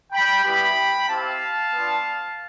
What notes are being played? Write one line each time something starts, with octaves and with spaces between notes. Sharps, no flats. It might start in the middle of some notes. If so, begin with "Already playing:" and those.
G5 B5
G3 B3 E4 G4 G5 B5
C4 E4 G4 F5 A5
B3 D4 F4